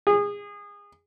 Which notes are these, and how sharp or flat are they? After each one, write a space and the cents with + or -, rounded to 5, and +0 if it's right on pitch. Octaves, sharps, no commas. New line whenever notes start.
G#4 -25